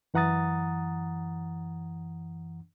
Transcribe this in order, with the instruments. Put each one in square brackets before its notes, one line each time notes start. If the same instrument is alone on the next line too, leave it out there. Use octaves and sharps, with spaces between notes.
[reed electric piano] F#2 E3 F#5 A#5 D#6 A6